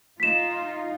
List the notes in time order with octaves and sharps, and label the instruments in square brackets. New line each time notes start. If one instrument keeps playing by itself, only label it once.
[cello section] D#4 F4 [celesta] B6 E7